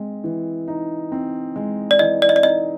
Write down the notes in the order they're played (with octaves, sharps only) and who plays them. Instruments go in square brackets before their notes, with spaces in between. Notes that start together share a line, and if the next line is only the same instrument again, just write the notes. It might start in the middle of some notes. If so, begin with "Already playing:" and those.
Already playing: [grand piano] G#3 C4
E3
D#4
C4
G#3
[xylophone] D5
[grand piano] E3 [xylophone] D#5
[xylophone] D5
D#5
D5
[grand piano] D#4 [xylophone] D#5